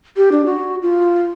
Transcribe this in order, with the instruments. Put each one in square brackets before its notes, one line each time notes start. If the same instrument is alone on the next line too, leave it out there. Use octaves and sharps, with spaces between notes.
[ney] G4
D4
F#4
F4